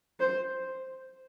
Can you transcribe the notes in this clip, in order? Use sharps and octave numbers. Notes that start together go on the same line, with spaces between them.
C5